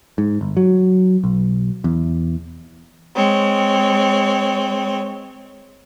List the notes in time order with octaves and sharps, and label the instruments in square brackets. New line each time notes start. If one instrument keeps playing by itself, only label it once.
[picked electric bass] G#2
G1
F#3
B1
E2
[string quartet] G#3 C4 C#5